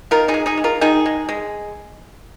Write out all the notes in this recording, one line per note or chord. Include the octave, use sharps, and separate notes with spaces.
D#3 F4 A#4
D#4 G#4
G#3
D#4 G#4
G#3
F4 A#4
D#3 D#4 G#4
G#3
G#3